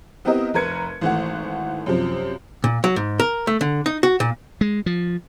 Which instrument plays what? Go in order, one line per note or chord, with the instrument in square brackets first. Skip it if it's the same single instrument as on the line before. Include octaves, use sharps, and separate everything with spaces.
[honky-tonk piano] B3 C4 E4 G4 A#4 D#5
F1 A#4 B4 G#6 C#7
G#1 E3 A3 F#5
F#2 C3 F3
[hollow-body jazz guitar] A#2
F#3
G#2
A#4
A3
D3
D#4
F#4
A#2
[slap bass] G#3
F3